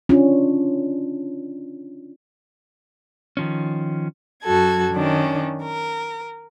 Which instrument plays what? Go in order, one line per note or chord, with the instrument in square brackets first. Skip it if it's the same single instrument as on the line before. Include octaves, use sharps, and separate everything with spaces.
[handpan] C#4 D4 F4
[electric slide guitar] D#3 F3 C#4
[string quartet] F#2 F#3 F#4 A4 G#6
D#3 C#4 D4
A#4